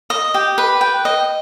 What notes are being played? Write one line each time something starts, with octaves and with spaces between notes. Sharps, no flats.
D#5
G4
B4
G5
D#5